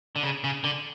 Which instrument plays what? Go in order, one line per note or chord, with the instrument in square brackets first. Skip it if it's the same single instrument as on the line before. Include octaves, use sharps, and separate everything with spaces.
[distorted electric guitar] D3
C#3
C#3
D3